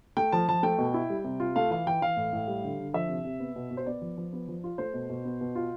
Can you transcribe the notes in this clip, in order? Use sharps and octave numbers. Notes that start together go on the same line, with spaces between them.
A3 G5
F3 A5
F3 A5
A3 G5
B2
E4
G3
C3
F4
A3 F5
E3 F5
E3 G5
E3 F5
A2
A2
G3
D3
D3
F3 E5
C3
C3
B3
B2
B2
C5
B3 D5
F3
F3
B3
F3
F4
A3 C5
B2
B2
B3
B2
F4